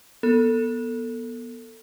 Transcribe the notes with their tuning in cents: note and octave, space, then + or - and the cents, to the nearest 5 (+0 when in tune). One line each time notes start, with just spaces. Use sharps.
B3 -25 A4 +20